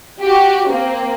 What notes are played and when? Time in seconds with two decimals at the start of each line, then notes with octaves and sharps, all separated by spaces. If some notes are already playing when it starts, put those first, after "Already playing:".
0.22 F#4 G4
0.70 A#3 C4